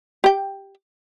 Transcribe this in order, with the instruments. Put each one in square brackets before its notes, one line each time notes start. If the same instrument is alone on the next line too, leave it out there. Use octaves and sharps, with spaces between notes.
[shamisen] G4 G5